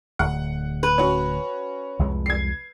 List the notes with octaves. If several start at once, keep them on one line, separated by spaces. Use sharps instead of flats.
D1 F#5
B4
C#4 F#4
C2 F2 G#3
G#6 C7